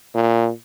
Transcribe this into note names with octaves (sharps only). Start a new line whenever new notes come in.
A#2